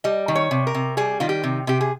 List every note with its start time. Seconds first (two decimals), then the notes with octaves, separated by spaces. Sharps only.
0.04 G3 D#5
0.28 D#3
0.35 C#5
0.51 C3
0.67 A#4
0.75 C3
0.97 G3 G#4
1.20 D#3 F4
1.29 G4
1.43 C3
1.67 C3 G4
1.81 G#4